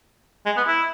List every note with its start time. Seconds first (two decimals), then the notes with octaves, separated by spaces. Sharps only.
0.46 G#3
0.57 B3
0.67 E4